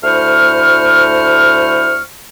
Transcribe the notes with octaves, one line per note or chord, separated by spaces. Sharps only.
D2 A3 E4 C5 C#6 F6